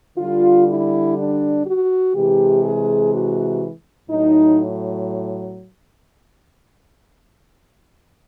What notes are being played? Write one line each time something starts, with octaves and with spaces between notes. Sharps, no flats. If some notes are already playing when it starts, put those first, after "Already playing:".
D3 G3 F4
E4
D4
F#4
C3 E3 G#3 G4
G#4
F#4
A2 F#3 D#4